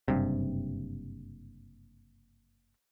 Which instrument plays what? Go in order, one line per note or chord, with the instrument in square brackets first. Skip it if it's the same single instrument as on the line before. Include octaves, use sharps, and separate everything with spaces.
[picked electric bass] F#1 G2 C3